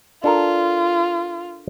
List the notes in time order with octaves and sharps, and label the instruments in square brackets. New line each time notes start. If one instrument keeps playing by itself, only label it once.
[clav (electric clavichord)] D4 A4 A#4 [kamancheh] F4